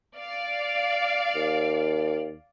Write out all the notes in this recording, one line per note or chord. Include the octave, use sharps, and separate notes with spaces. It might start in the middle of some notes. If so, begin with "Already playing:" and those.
D5 F5
D#2